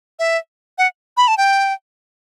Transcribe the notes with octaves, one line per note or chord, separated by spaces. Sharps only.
E5
F#5
B5
A5
G5